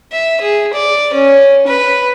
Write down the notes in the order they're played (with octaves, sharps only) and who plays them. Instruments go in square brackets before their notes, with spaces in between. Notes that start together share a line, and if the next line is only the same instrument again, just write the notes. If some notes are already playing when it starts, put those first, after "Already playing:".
[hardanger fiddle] E5
G#4
D5
C#4
B4